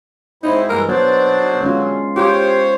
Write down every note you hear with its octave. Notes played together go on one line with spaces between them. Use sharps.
G#2 C4 D#4 E4
G2 E3 G#3 A#4
F#3 B3 D4 C5 D5
D3 G#3 C#4 F4
F4 G4 C5 C#5